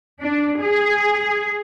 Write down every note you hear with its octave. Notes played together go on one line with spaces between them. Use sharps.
D4
G#4